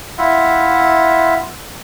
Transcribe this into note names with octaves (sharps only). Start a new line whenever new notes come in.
E4 F4 E5 F#5